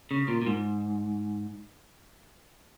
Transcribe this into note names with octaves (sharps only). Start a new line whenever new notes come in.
C#3
A#2
A#2
G#2